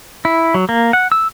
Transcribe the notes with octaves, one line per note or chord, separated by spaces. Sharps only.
E4
F#3
A#3
F#5
E6